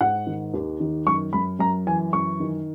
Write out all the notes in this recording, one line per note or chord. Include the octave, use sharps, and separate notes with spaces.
G#2 F#5
D#3
D#2
D#3
F#2 C#6
F#2 B5
F#2 A#5
E3 G#5
F#2 C#6
D#3